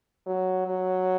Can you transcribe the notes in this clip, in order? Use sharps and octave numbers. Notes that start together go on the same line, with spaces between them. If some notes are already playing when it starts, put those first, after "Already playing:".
F#3
F#3